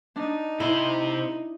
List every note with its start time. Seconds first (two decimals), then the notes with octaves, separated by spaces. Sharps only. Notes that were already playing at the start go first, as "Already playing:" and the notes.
0.16 D4 D#4
0.60 C3 E4 C5